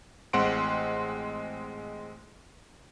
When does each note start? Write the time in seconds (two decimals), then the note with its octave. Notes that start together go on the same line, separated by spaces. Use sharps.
0.33 A1 G#3 C4 F#5 C6 D7